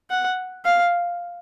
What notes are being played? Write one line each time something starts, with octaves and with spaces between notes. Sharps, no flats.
F#5
F5